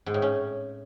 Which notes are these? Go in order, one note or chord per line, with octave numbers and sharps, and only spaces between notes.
G#2
A2
C#4